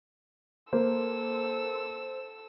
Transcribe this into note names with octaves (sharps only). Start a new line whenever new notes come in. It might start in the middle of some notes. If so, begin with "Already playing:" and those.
A#3 A4 C5 E6